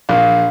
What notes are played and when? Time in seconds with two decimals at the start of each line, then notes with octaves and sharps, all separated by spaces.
0.09 A#1